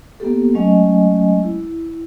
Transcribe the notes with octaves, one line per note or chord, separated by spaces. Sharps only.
A#3 B3 G4 A4
F#3 G#3 A3 C#4 D#5 G#5
E4